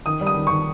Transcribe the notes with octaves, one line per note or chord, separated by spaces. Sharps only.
D#3 D#6
G3
D#6
D#3
D#3 C#6